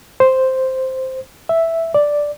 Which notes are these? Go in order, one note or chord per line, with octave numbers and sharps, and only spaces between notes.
C5
E5
D5